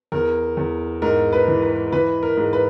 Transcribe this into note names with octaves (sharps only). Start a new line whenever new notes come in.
E2 A#4
E2
G#2 A#4
B4
E3
B4
E3 B4
A#4
G#2
B4